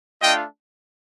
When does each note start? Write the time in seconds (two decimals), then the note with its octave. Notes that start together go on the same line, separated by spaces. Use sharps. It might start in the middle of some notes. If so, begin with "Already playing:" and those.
0.22 A3 D4 F4 D#5 G5